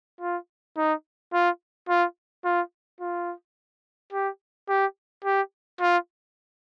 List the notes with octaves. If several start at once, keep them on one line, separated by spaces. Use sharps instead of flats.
F4
D#4
F4
F4
F4
F4
G4
G4
G4
F4